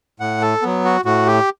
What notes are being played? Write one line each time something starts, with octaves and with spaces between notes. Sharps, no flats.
A2 F#5
A4
F#3 B3
F#4
A2 F#4
G4